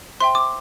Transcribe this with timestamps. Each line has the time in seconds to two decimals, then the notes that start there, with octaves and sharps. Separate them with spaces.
0.20 C5 E5 G5 C6
0.35 D6